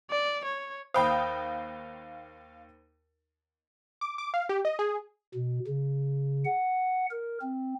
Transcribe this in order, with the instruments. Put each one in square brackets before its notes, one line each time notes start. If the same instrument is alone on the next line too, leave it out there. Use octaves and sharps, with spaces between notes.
[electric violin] D5
C#5
[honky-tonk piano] D#2 G5 D#6 [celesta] C5 B5 [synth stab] F5
[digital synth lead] D6
D6
F5
G4
D#5
G#4
[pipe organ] B2
C#3
F#5
A#4
C4